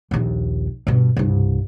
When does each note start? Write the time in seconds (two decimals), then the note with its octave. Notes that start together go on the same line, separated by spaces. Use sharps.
0.11 A#1 D#2
0.87 G2 B2
1.17 C2 G2